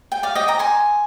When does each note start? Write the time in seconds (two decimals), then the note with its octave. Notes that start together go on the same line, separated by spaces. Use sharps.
0.12 G5
0.23 D5 F5
0.35 D#5 G5
0.48 G5 A#5
0.59 G#5 C6